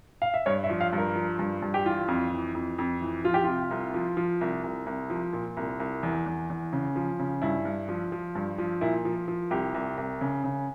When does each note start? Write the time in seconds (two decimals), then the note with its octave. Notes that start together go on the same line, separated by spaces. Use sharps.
0.22 F5
0.34 E5
0.46 G2 C#5
0.63 E5
0.69 F3
0.81 F5
0.93 G2
0.98 A#4
1.16 F3
1.39 G2
1.62 G2
1.74 G4
1.85 E3 F4
2.08 F2
2.32 E3
2.55 F2
2.78 F2
3.01 E3
3.24 F3 F4
3.34 G4
3.44 C3 F4
3.71 C2
3.94 F3
4.17 F3
4.41 C2
4.64 C2
4.86 C2
5.10 F3
5.33 A#2
5.57 C2
5.80 C2
6.03 E2
6.26 E2
6.50 E2
6.73 C#3
6.96 F3
7.20 C#3
7.42 G2 E4
7.65 G2
7.89 F3
8.12 F3
8.35 G2
8.58 F3
8.81 A#2 E4
9.05 F3
9.28 F3
9.51 C2 G4
9.74 C2
9.97 C2
10.21 C#3
10.44 C#3